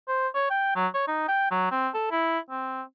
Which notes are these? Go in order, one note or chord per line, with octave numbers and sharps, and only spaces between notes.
C5
C#5
G5
F#3
C#5
D#4
G5
F#3
C4
A4
E4
C4